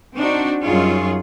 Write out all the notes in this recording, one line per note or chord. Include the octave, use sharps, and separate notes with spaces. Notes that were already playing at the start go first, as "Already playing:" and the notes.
C4 D4 D#4 F#4
F#2 G3 D#4 F4 G#4 C#5